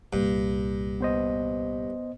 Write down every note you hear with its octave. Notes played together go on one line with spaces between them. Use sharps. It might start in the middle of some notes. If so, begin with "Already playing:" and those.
C2 G2 A#2
B3 C5 D#5